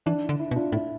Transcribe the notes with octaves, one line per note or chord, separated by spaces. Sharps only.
E3 D4
E4
D3
E4
B2
D4 F4
A2 E4